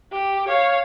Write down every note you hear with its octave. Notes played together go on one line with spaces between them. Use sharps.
G4
C#5 F5